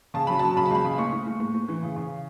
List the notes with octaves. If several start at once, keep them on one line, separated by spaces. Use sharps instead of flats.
C#3 A5
F#3 B5
F#3 A5
C#3 B5
A5
C#2 B5
C#3
A2 C#6
A2
A2
A2
A2
E3
C#3
C#3